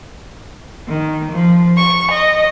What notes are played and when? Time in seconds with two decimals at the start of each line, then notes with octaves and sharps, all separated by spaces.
0.87 D#3
1.31 F3
1.76 C#6
2.12 D#5